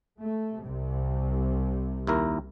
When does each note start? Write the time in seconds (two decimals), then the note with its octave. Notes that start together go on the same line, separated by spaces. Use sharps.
0.20 A3
0.63 C2 C3
2.07 D#2 E4 A#4